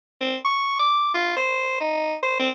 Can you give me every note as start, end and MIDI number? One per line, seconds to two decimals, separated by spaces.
0.21 0.36 60
0.45 0.78 85
0.79 1.12 86
1.14 1.33 65
1.37 1.77 72
1.80 2.15 63
2.23 2.39 72
2.39 2.50 60